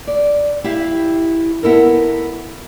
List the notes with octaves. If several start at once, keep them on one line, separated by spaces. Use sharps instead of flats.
D5
E4 G4 E5 F5
B3 E4 A4 A#4